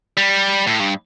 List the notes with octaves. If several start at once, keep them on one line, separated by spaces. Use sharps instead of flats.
G3
A2
G2